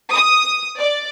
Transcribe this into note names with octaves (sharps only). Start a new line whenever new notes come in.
D#6
D5